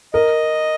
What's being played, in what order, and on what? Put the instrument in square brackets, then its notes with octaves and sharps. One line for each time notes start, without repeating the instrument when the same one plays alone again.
[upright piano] A#4 [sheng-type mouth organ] D#5